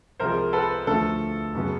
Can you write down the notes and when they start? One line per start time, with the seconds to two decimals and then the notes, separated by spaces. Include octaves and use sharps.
0.19 C2 C3 F3 G#3 A#4 C5
0.53 A4 B4
0.87 D2 D3 F3 A3 A4
1.54 F#2 C#3 F#3 B3